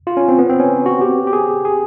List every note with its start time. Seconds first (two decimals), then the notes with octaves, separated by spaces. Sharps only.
0.07 F4
0.17 C#4
0.28 C4
0.39 B3
0.49 C4
0.60 C#4
0.86 F#4
1.01 G4
1.27 G4
1.33 G#4
1.65 G#4